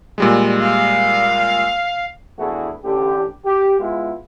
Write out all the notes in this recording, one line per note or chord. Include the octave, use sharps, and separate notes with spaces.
A#2 G3 G#3
F5
E2 A3 D4 E4 F#4 G#4
A1 D3 G4
G4
G#3 B3 E4 F4